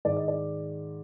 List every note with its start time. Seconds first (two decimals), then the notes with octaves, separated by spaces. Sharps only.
0.05 G#2 D#3 D5
0.17 D#5
0.28 D5